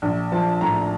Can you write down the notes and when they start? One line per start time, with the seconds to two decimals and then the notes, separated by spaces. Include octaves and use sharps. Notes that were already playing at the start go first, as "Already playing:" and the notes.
0.02 A#1
0.32 F3 A5
0.61 A2 A#5